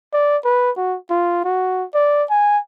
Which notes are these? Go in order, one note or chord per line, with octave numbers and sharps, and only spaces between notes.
D5
B4
F#4
F4
F#4
D5
G#5